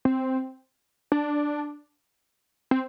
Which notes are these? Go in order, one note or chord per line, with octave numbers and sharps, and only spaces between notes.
C4
D4
C4